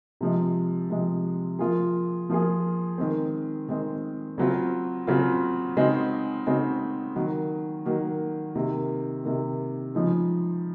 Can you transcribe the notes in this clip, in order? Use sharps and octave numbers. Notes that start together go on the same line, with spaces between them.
C3 F3 G#3
C3 F3 G#3
F3 A#3 F4 G#4
F3 A#3 F4 G#4
D#3 G#3 C4
D#3 G#3 C4
C#3 F#3 C4 F4
C#3 F#3 C4 F4
C#3 G#3 C4 D#4 F#4
C#3 G#3 C4 D#4 F#4
D#3 F#3 A#3
D#3 F#3 A#3
C3 D#3 A#3
C3 D#3 A#3
C#3 F3 G#3 D#4